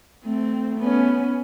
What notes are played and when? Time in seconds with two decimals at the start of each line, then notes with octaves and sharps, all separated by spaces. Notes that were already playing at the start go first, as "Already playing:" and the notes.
0.25 A3 C4
0.79 B3 C#4